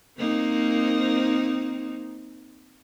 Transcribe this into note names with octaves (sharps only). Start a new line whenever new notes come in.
A#3 C4 D#4